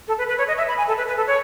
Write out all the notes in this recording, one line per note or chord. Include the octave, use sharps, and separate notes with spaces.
A4
B4
B4
C#5
D#5
E5
B5
G#5
A4
B4
B4
A4
C#5